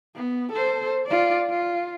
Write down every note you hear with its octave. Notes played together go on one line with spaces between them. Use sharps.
B3
A4 C5
F4 D5
F4